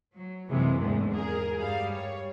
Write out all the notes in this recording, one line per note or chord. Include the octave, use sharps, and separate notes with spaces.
F#3
F#2 C3 E3 F#3 G#3 A#3
E2 G#2 D3 A3
G#4 A#4
G2 G3 F5
C#5